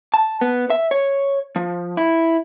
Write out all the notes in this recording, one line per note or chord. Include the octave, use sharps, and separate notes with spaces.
A5
B3
E5
C#5
F3
E4